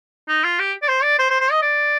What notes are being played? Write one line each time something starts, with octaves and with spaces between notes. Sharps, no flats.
D#4
F4
G4
D5
C5
D5
C5
C5
C5
D#5
D5